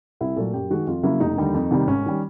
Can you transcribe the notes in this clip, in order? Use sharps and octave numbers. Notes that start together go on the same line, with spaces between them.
C2 E4
A#2 F#3 A3 A4
F#2 G4
D#3 G#3 F#4
F2 F4
C#3 F#3 A#3 E4
F1 D#4
D#2 D3 G3
F2
C3 D#3 G3
G#1 C#4
D#3 G3